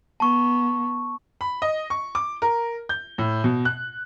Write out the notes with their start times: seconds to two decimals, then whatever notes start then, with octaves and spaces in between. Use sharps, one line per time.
0.20 B3 A5 C#6
1.41 B5
1.62 D#5
1.90 C#6
2.15 D6
2.42 A#4
2.89 G6
3.18 A2
3.44 B2
3.65 F#6